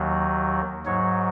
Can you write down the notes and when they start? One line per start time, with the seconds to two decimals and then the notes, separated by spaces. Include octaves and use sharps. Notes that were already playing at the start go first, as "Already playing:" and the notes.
Already playing: D#2 D#3 F#3
0.86 G#2 F#3 C#5